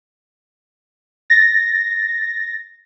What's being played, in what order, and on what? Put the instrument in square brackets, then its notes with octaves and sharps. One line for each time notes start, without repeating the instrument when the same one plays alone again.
[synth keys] A6 A#6